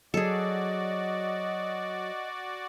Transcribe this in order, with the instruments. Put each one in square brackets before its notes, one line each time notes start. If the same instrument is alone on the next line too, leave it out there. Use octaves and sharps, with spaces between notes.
[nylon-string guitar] F#3 [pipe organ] F#4 D5 [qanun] G#4 A4 [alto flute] D#5